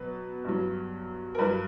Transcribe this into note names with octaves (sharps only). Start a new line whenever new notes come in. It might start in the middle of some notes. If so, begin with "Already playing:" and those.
Already playing: B2 F#3 B4
G2 F#3
A#4
G2 F#3 B4